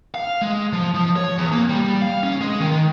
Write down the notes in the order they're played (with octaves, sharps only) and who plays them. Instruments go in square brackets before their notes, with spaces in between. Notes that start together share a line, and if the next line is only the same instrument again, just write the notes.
[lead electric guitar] F5
G#3
F3
F3
C#5
E2
A#3
G3
F5
C#4
G#3
D#3